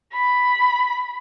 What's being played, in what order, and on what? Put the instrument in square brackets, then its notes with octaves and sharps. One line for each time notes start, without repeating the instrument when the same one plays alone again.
[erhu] B5